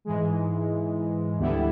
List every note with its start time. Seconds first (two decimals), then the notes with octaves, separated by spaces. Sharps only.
0.05 G#2 E3 G#3
1.38 D2 D3 G3 B3 E4